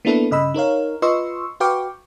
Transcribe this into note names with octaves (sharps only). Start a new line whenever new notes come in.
A#3 B3 D4 E4 A4 B4
G2 C#3 D#5 B5 E6
D#4 A#4 C#5 F5
F4 B4 D#5 C6 C#6 E6
F#4 B4 F5 G5 C#6 D6